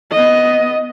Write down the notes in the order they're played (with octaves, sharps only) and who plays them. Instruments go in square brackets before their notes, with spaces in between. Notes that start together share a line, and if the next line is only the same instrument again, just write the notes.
[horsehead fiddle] B3 D#5